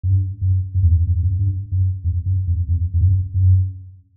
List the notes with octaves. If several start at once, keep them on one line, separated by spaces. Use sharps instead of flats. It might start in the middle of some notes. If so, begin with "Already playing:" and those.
F#2
G2
F#2
F#2
E2
F2
F2
F#2
G2
F#2
F2
F#2
F2
F2
F2
F#2
F#2